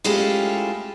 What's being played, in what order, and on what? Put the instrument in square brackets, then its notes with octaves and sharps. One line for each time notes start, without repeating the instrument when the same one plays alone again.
[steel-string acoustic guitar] G#3 A3 C#4 E4 F4 G4